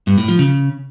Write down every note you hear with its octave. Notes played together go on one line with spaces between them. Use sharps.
G2
A2
F3
C#3